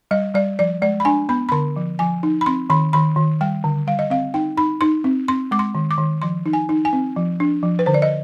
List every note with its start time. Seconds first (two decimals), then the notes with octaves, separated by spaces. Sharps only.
0.11 G3 D#5
0.35 G3 D5
0.59 F3 D5
0.82 G#3 D5
1.00 B5
1.05 D4 G#5
1.29 B3 B5
1.49 B5
1.52 D3 C6
1.76 F3
1.99 F3 G#5
2.23 D#4
2.41 B5
2.46 C4 C6
2.70 D#3 B5
2.93 D#3 B5
3.16 D#3
3.41 G3 G5
3.64 D3
3.87 G3 F5
3.99 D#5
4.10 C4 F5
4.34 D#4 G5
4.57 D#4 B5
4.81 D#4 C6
5.04 C4
5.28 C4 C6
5.51 G#3 D6
5.59 C6
5.75 D#3
5.91 D6
5.98 D#3
6.22 F3 C6
6.46 D#4
6.53 G#5
6.69 D#4
6.85 G#5
6.93 C4
7.16 F3
7.40 D4
7.63 F3
7.79 B4
7.86 D3 C5
7.94 D5
8.02 D#5